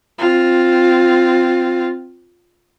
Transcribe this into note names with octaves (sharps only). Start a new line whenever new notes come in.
C4 F4